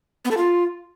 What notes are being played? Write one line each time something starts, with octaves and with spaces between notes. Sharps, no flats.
B3
A4
F4